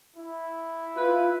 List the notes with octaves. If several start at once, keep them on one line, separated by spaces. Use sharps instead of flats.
E4
F4 B4